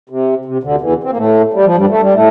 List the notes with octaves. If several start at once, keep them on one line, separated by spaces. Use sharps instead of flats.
C3
C3
D2 D3
E2 E3
C4
A#3
A2 A3
G3
F3
G2 G3
A3
G3
A2 A3